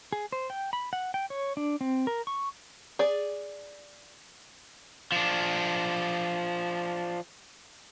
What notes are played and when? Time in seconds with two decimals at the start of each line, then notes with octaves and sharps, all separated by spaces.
0.13 G#4
0.32 C5
0.50 G5
0.73 B5
0.93 F#5
1.14 G5
1.30 C#5
1.57 D4
1.81 C4
2.07 A#4
2.27 C#6
2.99 G#4 D5
5.12 F3 D4